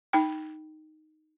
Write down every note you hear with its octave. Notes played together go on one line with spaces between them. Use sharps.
D#4 G5